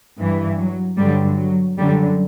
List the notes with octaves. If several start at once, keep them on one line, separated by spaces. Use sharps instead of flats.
G2 E3
F#3
G2 D3 F#3 G3
F#3
F#2 D3 F#3 G3